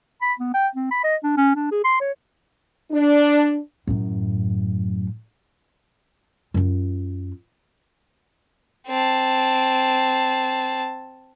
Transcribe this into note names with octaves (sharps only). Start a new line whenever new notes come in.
B5
B3
G5
C4
B5
D#5
D4
C#4
D4
G#4
C6
C#5
D4
F#2 A2
F#2 F4
C4 A5